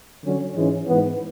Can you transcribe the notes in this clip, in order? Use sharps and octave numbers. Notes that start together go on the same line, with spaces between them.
D3 F#3 C#4
G#2 E3 G#3 C#4
G#2 E3 B3